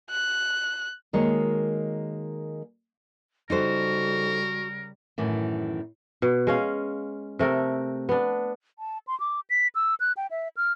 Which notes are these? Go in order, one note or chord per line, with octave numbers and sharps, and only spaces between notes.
F#6
D#3 G#3 A#3 F#4 C#5
C#3 G3 D#4 F#4 A4 A#4 C5
F#2 A2 D#3 E3
B2
G#3 C#4 F5
C3 A3 A#4
B3 D4
A5
C6
D6
B6
E6
F#6
G5
E5
F6